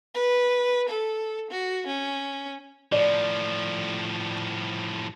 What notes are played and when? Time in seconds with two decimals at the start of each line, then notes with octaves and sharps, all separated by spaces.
0.15 B4
0.89 A4
1.51 F#4
1.87 C#4
2.92 A2 F3 D5